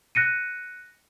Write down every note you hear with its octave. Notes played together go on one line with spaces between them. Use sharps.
F#6 A#6 C#7 D#7